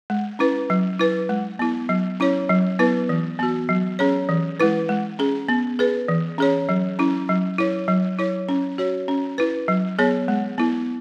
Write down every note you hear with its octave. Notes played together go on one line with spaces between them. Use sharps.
G#3
C#4 E4 B4
F#3
E4 B4
G#3
B3 E4
F#3
C#4 E4 C#5
F#3
B3 E4 B4
E3
B3 F#4
F#3
C#4 G#4 C#5
E3
G#3 E4 B4
G#3
C#4 G#4
B3
G#4 B4
E3
C#4 G#4 C#5
F#3
C#4 E4
F#3
E4 C#5
F#3
E4 C#5
C#4
F#4 C#5
C#4
E4 B4
F#3
B3 G#4 C#5
G#3
B3 E4